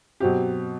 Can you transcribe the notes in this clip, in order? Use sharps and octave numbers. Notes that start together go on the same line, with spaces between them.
B2 F#3 C4 G4